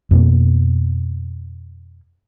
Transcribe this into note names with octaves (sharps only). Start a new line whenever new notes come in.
F2 B2 A#3